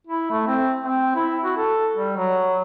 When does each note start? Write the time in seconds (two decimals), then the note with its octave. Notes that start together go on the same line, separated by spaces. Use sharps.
0.07 E4
0.30 A3
0.47 C4
0.82 C4
1.15 E4
1.44 F#4
1.57 A4
1.96 G3
2.16 F#3